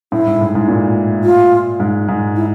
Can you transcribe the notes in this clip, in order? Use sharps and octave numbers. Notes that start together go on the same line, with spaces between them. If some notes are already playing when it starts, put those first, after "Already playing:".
A2 E4
G#2
G#2
G#2
A#2
F4
G#2
G#2
E4